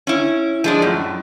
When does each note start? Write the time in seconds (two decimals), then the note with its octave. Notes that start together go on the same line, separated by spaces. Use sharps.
0.07 C#4 E4
0.64 F3 G#3 D4
0.82 F#2 A2